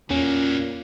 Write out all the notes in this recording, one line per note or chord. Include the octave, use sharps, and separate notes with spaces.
E2 A#2 F#3 A#3 C#4